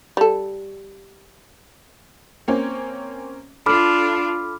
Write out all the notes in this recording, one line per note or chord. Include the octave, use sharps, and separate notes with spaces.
G3 A4
A#3 C4 C#4
D4 F4 A4 B5 D6 F6